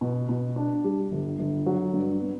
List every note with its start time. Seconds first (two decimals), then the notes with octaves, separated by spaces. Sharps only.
0.01 B2
0.29 B2
0.56 D4
0.84 G3
1.12 G1
1.39 G1
1.66 F#3
1.94 G2
2.21 B3